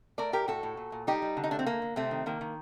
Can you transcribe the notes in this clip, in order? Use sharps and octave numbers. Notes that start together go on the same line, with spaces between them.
A3 A#4 D5
A2 G4 A#4
A2 F#4 A4
A2
A#2
A#2
G3 D#4 G4
G3
D3
D#4
A3 D4
C4
D3 A#3
D3
C3 A3 C4
D#3
D#3 A#3
D#3